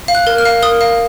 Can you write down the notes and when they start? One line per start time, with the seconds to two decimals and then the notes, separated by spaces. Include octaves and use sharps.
0.08 F5
0.15 F#6
0.27 A#4
0.38 F6
0.45 F5
0.63 A#4 D#6
0.81 F5